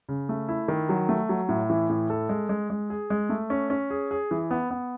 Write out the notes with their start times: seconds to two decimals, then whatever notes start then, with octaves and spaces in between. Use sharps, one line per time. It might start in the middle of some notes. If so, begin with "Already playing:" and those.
0.09 C#3
0.29 A3
0.49 E4
0.68 D#3
0.89 F#3
1.09 A3
1.29 F#3
1.49 A2
1.70 E3
1.90 A2
2.10 A4
2.29 G#3
2.49 G#3
2.70 G#3
2.90 G#4
3.10 G#3
3.29 A3
3.50 C#4
3.70 C#4
3.90 G#4
4.11 G#4
4.31 E3
4.51 B3
4.70 B3